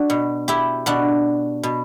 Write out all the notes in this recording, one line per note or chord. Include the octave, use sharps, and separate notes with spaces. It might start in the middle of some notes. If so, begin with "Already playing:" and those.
Already playing: D4 F#4
B2
E4 G4
B2 D4 F#4
B2